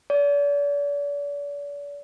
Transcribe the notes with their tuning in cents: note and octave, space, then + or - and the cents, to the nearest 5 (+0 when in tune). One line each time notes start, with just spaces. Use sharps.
D5 -40